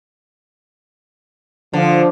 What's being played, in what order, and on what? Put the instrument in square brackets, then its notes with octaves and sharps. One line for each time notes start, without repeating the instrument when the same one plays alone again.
[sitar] D3 [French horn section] F3